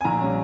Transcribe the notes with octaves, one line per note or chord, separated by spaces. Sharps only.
G#5
A#1 A#5
G3 C#4